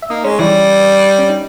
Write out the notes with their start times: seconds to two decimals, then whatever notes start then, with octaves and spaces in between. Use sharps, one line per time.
0.02 E5
0.10 A#3 D#4 D#5
0.24 G#3 C#4 C#5
0.39 E3 G3 E4
1.19 C#4
1.30 D#4